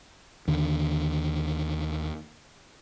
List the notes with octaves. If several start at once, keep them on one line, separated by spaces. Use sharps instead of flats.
D#2 D3